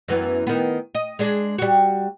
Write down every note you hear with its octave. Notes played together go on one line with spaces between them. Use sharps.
F#2 E3 B3
D#3 B3
D#5
G#3 D4 G#4
G3 F#4